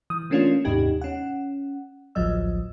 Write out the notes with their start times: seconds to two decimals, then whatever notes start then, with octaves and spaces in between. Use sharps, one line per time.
0.10 E3 D#6
0.30 E3 A3 A#3 C#4 D4 F4
0.64 D#2 G#2 C3 D#4 G4 G#6
1.01 C#4 F#5
2.15 A1 D2 F3 F#3 D#5 E6